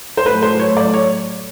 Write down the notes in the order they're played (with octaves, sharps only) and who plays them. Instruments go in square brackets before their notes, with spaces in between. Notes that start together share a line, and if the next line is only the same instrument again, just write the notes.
[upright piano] C5
[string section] A2 F#3 A3 [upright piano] B4
[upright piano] C5
C#5
D5
C#5